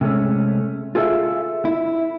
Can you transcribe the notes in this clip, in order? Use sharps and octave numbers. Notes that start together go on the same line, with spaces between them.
C3 G#3 A3 C#4
F4 G#4 A4 C#5 E5 F5
E4